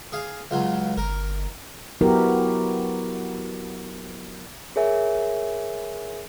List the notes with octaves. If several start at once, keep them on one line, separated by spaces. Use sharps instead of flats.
G#4 F5
C#2 F#3 F4
G1 A#4
F#3 B3 E4 F#4 G4 A#4
G#4 A#4 C#5 E5 G#5